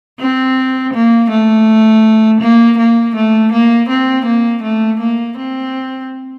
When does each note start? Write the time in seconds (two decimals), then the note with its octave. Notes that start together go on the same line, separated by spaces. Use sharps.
0.20 C4
0.93 A#3
1.30 A3
2.41 A#3
2.78 A#3
3.16 A3
3.52 A#3
3.89 C4
4.26 A#3
4.63 A3
5.00 A#3
5.38 C4